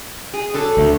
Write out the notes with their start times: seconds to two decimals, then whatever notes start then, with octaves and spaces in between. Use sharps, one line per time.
0.34 G#4
0.54 D3 F#3 A4
0.77 D2